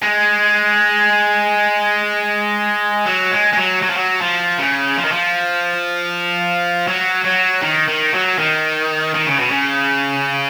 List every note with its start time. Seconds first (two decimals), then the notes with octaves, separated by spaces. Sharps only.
0.02 G#3
3.06 F#3
3.31 G#3
3.53 G#3
3.57 F#3
3.82 F#3
3.89 F3
3.96 F#3
4.21 F3
4.58 C#3
4.97 F3
5.05 D#3
5.12 F3
6.87 F#3
7.24 F#3
7.62 D#3
7.88 D#3
8.14 F#3
8.38 D#3
9.14 D#3
9.27 C#3
9.39 B2
9.51 C#3